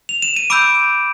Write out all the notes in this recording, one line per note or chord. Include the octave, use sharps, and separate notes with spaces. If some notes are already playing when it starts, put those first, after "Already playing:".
F7
E7
D#7
B5 D6 E6 G6 D7